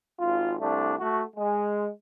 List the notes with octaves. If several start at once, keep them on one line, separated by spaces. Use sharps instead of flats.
G#1 F4
C2 A3 D4
A3 F#4
G#3